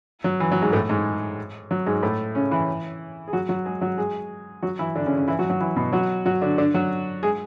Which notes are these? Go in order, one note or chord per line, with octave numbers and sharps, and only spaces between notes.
F#3
E3
F#3
G#2 G#3
A2 A3
G#2 G#3
F#3
G#2 G#3
A2 A3
C#3 C#4
E3 E4
G#4
F#3 F#4
F#3 F#4
G#3 G#4
F#3 F#4
G#3 G#4
F#3 F#4
E3 E4
D3 D4
C#3 C#4
C#3 C#4
E3 E4
F#3 F#4
F#3 F#4
E3 E4
B2 B3
F#3 F#4
F#3 F#4
D3 D4
D3 D4
F#3 F#4
G#3 G#4